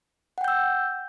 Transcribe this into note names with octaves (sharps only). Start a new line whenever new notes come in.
F#5 G5 E6 G6